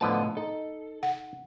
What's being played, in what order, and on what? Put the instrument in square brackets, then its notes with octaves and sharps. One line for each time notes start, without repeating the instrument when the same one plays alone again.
[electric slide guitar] A2 D#5 A5 [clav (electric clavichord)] D3 F3 B3
[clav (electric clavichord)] D#4 [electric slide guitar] A4
[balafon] F#5